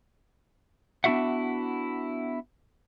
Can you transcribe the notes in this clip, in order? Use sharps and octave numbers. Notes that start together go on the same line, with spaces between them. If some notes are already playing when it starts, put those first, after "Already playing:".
B3 D4 E4 F#4 E5 F#5